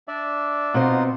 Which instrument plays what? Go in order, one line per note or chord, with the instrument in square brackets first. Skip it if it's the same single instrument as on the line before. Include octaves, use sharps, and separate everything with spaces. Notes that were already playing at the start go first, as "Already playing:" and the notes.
[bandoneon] D4 D5 E5
[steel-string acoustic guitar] B2 C4 [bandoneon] D#4 F4 F#5